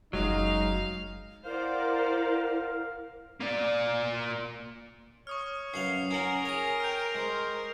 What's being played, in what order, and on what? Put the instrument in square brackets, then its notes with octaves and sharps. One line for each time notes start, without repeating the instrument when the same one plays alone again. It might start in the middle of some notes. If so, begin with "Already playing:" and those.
[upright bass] F#1 E2 [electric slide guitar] F#3 G#3 [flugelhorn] D#4 [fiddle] F5
[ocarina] E4 [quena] A#4 [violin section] C5 D5 F#5 [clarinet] F5
[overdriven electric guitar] A#3 D5
[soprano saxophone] C#5 [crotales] C#6 D#6 F6
[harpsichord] F#2 B4 F5 [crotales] C7
[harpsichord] C#4 F#5 [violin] A#4 [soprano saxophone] G#5
[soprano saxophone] G#4 [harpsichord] C#5 A#5 [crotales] A#6
[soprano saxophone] G5 [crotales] F6 G6
[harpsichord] G#3 [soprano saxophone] C5